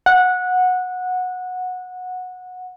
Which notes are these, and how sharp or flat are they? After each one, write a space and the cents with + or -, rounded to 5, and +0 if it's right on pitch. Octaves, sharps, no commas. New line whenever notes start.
F#5 -15